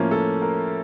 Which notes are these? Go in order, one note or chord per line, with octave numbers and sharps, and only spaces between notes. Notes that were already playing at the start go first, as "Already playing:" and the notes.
Already playing: A2 F3 A#3 C#4
A4
A#4